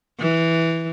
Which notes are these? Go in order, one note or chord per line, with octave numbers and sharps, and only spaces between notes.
E3